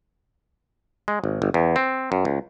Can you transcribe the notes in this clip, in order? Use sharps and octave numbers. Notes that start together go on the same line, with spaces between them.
G#3
G#1
G1
E2
C4
F#2
C#2